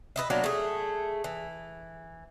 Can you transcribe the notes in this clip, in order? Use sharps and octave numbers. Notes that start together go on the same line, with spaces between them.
B4 D#5 E5
B2 F#3 A#3 D4
A3 G#4
E3